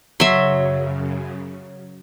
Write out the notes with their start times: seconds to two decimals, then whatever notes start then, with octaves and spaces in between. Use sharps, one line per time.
0.20 F#2 C#3 F#3 E5 C6